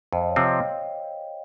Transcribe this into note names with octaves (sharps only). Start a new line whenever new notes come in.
F2 C5 D#5
C#5 F5
C3 F3 C4
D#5 G5